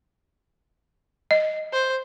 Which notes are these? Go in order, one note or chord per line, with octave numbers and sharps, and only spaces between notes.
D#5
C5